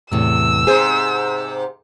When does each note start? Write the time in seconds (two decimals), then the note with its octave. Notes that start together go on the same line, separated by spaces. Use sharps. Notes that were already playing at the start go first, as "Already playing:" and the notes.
0.12 E2 A2 C3 E6
0.67 G#2 C3 G#4 C5